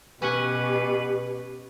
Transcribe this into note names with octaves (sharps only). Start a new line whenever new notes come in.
B2 C#4 G4 B4 F#5 G#5